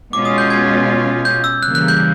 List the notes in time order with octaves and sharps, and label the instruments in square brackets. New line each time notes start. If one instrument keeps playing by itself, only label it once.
[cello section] B2 G#3 C#4 F4 [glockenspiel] D6
[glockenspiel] D#6
G6
G#6
G6
E6
[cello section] C#3 E3 G3 A#3 [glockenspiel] F#6
[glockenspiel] F#6
G6